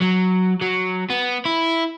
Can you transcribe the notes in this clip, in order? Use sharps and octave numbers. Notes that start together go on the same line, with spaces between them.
F#3
F#3
B3
E4